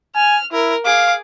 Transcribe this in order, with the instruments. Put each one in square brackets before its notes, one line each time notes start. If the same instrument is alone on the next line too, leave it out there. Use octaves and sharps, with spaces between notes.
[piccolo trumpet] G#5 [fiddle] F6
[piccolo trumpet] E4 [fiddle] A#4
[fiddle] G#4 D6 [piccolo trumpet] F5